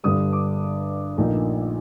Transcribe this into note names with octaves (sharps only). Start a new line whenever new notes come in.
G1 G2 D3 G3 D#6
D6
A#1 A#2 A3 D#4